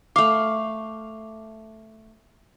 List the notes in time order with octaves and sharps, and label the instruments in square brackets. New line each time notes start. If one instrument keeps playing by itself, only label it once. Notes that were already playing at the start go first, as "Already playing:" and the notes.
[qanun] A3 F5 [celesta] D6